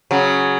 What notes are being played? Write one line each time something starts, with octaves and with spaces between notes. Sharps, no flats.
C#3 F#3